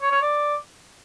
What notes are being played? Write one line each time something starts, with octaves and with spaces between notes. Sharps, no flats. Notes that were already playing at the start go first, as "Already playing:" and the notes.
C#5
C#5
D5